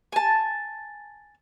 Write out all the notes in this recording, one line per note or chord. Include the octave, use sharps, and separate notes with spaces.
G#5 A5